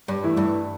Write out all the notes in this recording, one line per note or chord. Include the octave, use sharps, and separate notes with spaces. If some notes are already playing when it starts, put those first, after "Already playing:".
G2
E3 A3 E4
G2